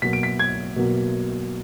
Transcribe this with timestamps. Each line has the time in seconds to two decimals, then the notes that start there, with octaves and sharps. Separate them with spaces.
0.02 B2 F#3 A#3 B6
0.13 D7
0.23 B6
0.39 G#6
0.76 B2 F#3 A#3